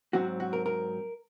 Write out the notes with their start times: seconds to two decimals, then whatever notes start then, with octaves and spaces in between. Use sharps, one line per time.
0.13 G#2 F#3 C4 F#4
0.40 F#4
0.53 A#4
0.66 A#4